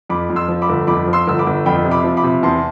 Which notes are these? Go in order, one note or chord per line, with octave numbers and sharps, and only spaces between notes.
F2 B5 D6
F2
C6 E6
F3
B5 D6
G1
F2 B5 D6
F3
C6 E6
G1 E6
B5 D6
G1
F2 G5 B5
C3
B5 D6
F3
B5 D6
C3
E2 A5 C6